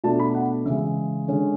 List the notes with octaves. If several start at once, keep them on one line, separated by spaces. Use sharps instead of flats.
B2 A3 D4 A5
B5
F#5
C#3 E3 G#3 E5
D3 G#3 C#4